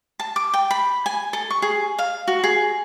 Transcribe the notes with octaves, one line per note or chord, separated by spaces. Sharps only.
A5
D6
G5
B5
G#5
A4
C#6
G#4
F5
F#4
G#4